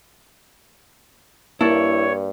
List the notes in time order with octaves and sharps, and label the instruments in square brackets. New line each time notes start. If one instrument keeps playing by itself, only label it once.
[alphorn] G2 [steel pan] A#3 A5 [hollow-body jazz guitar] E4 [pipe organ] C#5